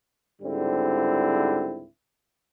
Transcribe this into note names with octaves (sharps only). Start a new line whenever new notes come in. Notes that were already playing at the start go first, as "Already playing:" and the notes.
C#2 G#2 D3 G3 C4 E4